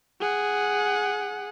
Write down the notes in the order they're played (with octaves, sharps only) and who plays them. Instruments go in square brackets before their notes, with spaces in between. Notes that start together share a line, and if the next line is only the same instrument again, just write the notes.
[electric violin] G#4 F#5